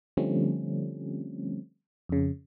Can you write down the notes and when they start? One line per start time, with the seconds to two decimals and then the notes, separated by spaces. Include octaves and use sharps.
0.17 D3 F3 G3 A3 C4 C#4
2.09 F2 C#3